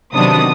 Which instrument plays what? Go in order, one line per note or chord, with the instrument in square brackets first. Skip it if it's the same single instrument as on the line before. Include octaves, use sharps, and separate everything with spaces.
[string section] C3 D#3 F#3 B3 D4 D#6